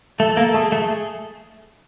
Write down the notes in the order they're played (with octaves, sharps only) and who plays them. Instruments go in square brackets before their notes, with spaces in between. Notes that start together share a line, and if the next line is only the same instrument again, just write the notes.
[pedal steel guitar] A3 [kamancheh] A4
[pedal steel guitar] A#3
[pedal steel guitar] A3 [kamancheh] G#4
[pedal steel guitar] A3